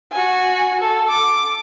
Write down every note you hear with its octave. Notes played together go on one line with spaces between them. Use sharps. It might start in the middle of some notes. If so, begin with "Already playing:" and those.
F#4 G#5
A4
D6